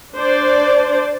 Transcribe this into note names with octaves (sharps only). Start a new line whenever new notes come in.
D4 C5 D5